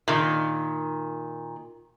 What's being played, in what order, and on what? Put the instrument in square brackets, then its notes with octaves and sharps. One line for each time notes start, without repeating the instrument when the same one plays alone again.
[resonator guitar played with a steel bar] A#2 D#3